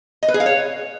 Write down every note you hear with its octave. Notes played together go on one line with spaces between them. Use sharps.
D#5
B4
G#4
F5
C#5